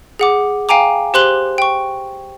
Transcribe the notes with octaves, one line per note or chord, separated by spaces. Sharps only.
G#4 F#5 D6
F5 G5 G#5 A#5 D6
G4 C5 C6 F#6 F#7 G7
G5 C#6